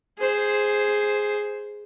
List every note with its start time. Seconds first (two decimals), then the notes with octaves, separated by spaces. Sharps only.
0.18 G#4 C5